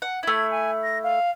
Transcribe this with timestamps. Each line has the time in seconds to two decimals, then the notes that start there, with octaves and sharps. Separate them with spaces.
0.02 F#5
0.23 A3 E4 G#6
0.50 G#5
0.83 A#6
1.03 F5